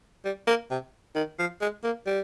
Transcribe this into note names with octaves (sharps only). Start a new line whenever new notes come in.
G3
A#3
C3
D#3
F3
G#3
A#3
G3